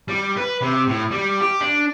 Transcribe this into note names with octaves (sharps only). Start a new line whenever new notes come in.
G3
B4
C3
A2
G3
G4
D4